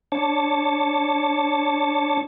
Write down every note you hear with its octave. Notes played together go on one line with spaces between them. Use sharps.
D4 C#5 A5